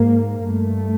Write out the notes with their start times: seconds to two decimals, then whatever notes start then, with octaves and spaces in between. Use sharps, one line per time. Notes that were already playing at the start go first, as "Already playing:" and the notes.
Already playing: G#2 A#3
0.45 G2 A3